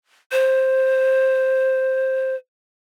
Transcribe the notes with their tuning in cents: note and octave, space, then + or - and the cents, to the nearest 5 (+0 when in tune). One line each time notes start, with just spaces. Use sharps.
C5 +5